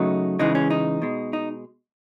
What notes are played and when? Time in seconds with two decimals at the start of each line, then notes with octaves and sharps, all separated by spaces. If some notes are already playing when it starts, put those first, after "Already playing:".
Already playing: C#3 F#3 A3 D#4
0.39 C#3 E3 G#3 D#4
0.55 C#4
0.70 D#4
1.02 B2 G#3
1.33 D#4